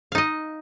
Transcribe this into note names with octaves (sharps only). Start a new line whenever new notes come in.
D#4 D#5 F5